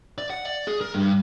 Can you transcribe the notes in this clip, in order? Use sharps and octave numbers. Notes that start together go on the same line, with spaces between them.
D5
F#5
D5
G#4
A#4
G2